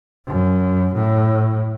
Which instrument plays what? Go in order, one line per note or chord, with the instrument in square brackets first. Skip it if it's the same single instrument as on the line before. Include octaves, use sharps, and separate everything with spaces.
[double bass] F#2
A2